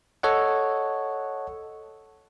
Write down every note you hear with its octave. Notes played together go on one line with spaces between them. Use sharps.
A4 C#5 D#5 F#5